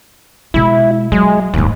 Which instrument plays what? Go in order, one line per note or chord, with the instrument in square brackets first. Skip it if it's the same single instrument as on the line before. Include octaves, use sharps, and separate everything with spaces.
[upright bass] B2 G#3 [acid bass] E4
[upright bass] F#3 [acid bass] G#3
[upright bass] D1 G#2 [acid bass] D#2